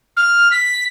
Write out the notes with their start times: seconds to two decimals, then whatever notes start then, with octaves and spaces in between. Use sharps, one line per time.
0.16 F6
0.51 B6